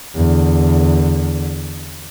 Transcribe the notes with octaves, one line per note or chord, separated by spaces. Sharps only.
E2 D3